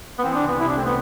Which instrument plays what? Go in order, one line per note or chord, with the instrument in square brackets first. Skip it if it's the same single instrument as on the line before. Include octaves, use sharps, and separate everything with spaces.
[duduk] B3
[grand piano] E3 [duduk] C4
[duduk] D4
[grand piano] C2
[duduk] B3
[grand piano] C3 [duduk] E4
[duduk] D4
[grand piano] A3 [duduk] C4
[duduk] B3